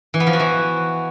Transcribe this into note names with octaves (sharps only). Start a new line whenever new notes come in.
E3
B3
F3
F#4
E3